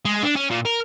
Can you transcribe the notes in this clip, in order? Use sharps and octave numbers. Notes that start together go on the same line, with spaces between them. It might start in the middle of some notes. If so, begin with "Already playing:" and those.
G#3
D4
C#4
A#2
A#4